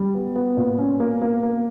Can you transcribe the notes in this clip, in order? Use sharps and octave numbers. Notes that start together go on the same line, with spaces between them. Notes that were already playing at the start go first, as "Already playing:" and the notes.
Already playing: G3
B3
B3
A#2
C#4
A#3
A#3
A#3